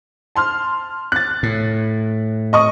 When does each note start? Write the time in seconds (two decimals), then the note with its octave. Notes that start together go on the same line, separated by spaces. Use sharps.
0.36 A5 C6 F6
1.12 F#6 A6
1.43 A2
2.53 D#5 C#6 D#6